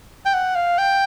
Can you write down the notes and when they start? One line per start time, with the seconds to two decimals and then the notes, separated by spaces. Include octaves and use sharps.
0.25 G5
0.34 F#5
0.56 F5
0.79 G5